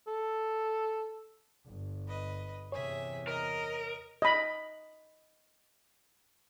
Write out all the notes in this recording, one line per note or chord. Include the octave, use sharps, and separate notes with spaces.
A4
G1
B4 D#5
E2 C3 G#4 C#5 E5
A#4 D#5 A#5
D#5 B5